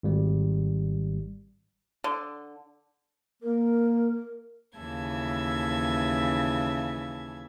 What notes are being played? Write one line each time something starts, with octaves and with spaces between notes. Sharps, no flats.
G#1 G3
D3
A#3 A#4
D#2 C#3 E3 E5 A5 G#6